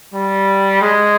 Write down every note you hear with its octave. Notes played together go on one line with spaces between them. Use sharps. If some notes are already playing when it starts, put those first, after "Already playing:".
G3
G#3